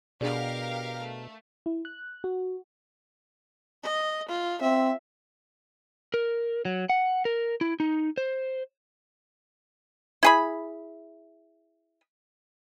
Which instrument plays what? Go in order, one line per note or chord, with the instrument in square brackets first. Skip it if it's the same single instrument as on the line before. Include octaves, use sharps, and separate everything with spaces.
[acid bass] B2 [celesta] D4 G#4 D5 [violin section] G4 A#4 F5
[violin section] A3
[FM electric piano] E4
F#6
F#4
[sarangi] D#5
F4
[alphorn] C4 [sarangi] E5
[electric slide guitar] A#4
F#3
F#5
A#4
E4
D#4
C5
[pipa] E4 G#4 B5